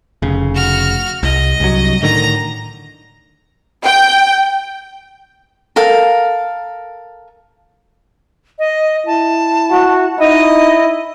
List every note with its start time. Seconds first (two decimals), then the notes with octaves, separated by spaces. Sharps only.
0.22 F1 C#3
0.54 F#4 F6
1.23 C2 D#5
1.60 C2 G2 F#3
2.03 A2 D3 D#3 A#5
3.83 G5
5.76 A4 A#4 F5
8.59 D#5
9.06 E4 A5
9.71 F#4
10.19 D#4 E4 D#5